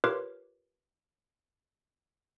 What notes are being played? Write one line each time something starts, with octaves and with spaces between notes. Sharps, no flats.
F4 G4 A#4 B4 C#5 D6